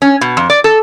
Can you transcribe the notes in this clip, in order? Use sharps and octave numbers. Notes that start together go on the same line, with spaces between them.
C#4
B2
F2
D5
A4